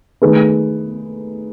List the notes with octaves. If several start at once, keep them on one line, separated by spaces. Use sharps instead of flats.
D#3 A3 D#4 G#4 B4